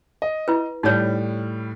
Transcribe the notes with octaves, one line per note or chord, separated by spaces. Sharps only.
D#5
E4 B4
A2 G3 D#4 C#5